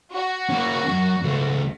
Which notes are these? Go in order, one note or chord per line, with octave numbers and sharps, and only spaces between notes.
F#4
A#3 C#4
F#2
C#2 A3